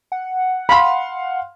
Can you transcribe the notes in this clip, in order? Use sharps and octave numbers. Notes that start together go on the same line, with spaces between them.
F#5
F5 B5 C6